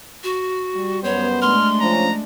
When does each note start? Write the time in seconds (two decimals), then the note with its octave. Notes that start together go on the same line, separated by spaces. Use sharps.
0.24 F#4
0.74 G3
1.04 F#2 B3 C5 C#5
1.42 G#3 A3 D4 C6 F6
1.81 F3 C#4 A#5